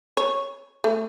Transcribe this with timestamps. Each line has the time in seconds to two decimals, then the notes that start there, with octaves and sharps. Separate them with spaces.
0.17 C#5
0.84 A3